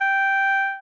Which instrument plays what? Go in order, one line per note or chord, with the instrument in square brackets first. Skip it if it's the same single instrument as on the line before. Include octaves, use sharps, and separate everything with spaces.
[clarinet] G5